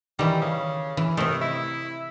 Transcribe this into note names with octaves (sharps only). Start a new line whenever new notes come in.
D#3 E3 G3
C#3
E3
C3 D#3 A3
E4